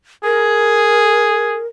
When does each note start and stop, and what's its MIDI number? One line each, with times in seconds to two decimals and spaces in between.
0.24 1.60 68
0.24 1.67 70